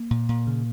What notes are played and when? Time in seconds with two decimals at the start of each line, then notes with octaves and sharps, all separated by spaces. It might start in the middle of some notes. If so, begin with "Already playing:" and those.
Already playing: A#3
0.11 A#2
0.29 A#2
0.47 C#3